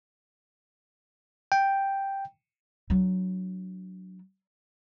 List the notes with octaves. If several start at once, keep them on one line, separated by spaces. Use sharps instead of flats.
G5
F#3 D4